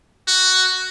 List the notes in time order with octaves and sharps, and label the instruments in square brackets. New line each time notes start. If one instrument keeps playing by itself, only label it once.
[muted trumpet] F#4